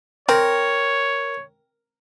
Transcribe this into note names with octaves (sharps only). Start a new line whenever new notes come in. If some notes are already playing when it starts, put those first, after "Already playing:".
C4 A#4 C#5